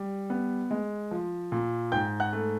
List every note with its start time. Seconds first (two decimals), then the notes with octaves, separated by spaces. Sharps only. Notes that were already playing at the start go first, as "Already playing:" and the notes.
Already playing: G3
0.30 B3
0.71 G#3
1.11 F3
1.52 A#2
1.92 G#2 G5 G6
2.20 F#5 F#6
2.33 A3